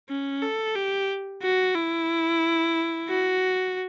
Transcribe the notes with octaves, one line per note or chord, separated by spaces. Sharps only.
C#4
A4
G4
F#4
E4
F#4